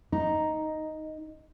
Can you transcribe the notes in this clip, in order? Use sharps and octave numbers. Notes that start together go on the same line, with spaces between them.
D#4